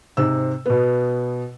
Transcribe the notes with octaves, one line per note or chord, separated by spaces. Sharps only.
G#2 C3 E6
B2 B3